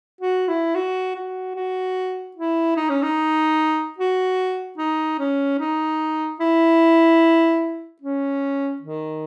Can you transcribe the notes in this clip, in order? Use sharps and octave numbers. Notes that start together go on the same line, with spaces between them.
F#4
E4
F#4
F#4
F#4
E4
D#4
C#4
D#4
F#4
D#4
C#4
D#4
E4
C#4
D#3